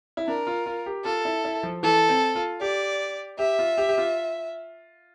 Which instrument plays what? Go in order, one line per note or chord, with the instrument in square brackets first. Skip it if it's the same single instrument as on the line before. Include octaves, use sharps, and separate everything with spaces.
[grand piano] E4
[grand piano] D4 [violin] A#4
[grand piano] F4
F4
G4
[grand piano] F4 [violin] A4
[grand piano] E4
E4
F3
[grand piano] E3 [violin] A4
[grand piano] C4
F4
[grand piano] G4 [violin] D5
[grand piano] G4 [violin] E5
[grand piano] F4
G4
G4
F4